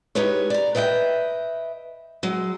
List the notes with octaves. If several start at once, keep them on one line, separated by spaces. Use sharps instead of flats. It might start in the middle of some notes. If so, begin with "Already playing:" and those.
G#3 D#4 G4 B4 C#5
D5 A#5
B4 D#5 E5 F#5 G5
F#3 G#3